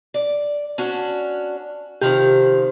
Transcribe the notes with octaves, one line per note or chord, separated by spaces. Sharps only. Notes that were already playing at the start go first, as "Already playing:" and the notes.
D5
C#4 D4 F#4
C3 D#3 F3 G4